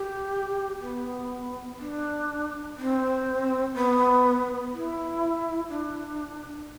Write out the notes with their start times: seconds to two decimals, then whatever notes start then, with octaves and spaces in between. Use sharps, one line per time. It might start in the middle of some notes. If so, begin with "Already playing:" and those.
Already playing: G4
0.81 B3
1.79 D4
2.77 C4
3.74 B3
4.72 E4
5.69 D4